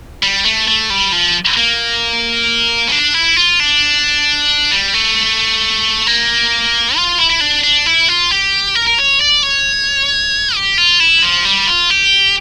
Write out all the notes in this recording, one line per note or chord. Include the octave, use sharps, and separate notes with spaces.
G3
A3
A3
G3
F3
A#3
C#4
D4
E4
F4
D4
G3
A3
A#3
F4
E4
E4
D4
D4
E4
F4
G4
A#4
A#4
C#5
D5
C#5
G4
F4
E4
F3
G3
F4
G4